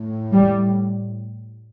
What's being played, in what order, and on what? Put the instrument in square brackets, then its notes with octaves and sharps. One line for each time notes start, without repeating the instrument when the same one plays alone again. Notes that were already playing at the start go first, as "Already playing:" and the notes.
Already playing: [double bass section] A2
G3